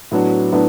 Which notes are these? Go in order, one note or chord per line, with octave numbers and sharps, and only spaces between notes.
A2 F#3 B3 D4 F#4
A2 F#3 B3 D4